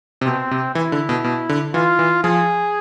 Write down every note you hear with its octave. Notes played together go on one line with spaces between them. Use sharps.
C3
B2 C4
C3
E3 E4
D3
B2
B2
D3
E3 F4
E3
F3 G#4